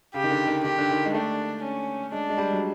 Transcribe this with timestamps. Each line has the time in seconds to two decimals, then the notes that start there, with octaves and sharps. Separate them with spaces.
0.14 C#3 G4
0.24 D#3
0.31 D3
0.47 D#3
0.64 D#3 G4
0.78 D3
0.91 D#3
1.05 G#3
1.14 A3 D4
1.63 C#4
2.12 G#3 D4
2.29 G#3
2.38 G3
2.52 F#3